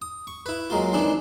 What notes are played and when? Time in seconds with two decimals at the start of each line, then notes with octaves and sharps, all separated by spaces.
0.02 D#6
0.27 C#6
0.46 E4 B4
0.70 F#3 G#3 A#3 F4
0.93 D#3 E3 G#3 C4 D4